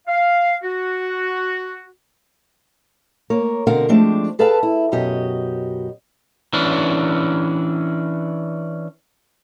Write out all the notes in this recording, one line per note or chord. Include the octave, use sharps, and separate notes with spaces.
F5
F#4
A#3 A#4 C#5
B2 D3 C4 A#4 F5 F#5
F3 G#3 A3 C4 D4 G4
G#4 A4 B4 F5 G5 A5
E4
F#2 B2 F#4 G4 D#5
E3 C#4 D4